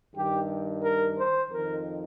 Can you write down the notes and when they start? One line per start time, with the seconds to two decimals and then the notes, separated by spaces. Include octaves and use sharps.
0.15 G2 D#3 G4
0.82 A#4
1.17 C5
1.50 F2 D#3 A#4